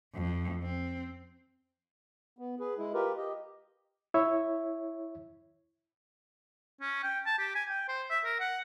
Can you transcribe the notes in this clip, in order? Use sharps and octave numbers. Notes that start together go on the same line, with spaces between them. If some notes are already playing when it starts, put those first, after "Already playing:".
F2
C4
B3
G#4 B4
G#3 E4
F4 G4 A#4 B4
G4 D#5
E4 C#5 E5
C#4
G5
A5
G4
G#5
G5
C5
E5
A#4
F#5